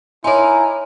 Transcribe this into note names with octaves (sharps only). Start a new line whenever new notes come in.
D#4 E4 A#4 C#5 G#5 C6